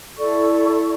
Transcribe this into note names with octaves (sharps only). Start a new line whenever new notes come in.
E4 A4 D5 C#6